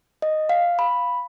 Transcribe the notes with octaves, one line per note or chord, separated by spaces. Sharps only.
D#5
F5
B5